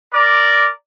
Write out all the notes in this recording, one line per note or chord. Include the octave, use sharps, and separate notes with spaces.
A#4 D5